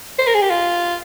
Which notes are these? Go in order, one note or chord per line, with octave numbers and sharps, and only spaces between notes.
C5
A#4
G#4
G4
F4